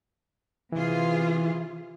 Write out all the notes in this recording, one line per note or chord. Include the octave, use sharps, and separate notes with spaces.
C3 E3 F4 G#4